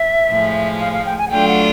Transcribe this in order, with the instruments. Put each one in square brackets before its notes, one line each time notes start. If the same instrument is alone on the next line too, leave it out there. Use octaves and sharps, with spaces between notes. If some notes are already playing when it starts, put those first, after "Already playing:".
Already playing: [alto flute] E5
[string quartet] A2 F3 G#3
[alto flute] F5
F5
G5
G#5
F#5
[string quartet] F#3 A3 D4 F4 [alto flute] G5
[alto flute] F#5